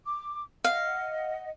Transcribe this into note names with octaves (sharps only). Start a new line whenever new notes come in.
D6
D#5 F5 F#5